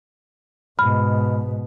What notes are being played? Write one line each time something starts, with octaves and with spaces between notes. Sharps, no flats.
G#2 B2 B5 F6